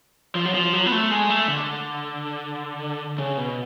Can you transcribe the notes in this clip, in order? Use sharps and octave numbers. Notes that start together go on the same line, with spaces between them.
F3
F#3
F3
F#3
B3
A3
G#3
A3
D3
C#3
B2